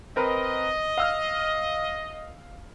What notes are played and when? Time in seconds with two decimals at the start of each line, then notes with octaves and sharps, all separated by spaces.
0.16 C4 A#4 B4 D#5
0.98 F5 E6 F6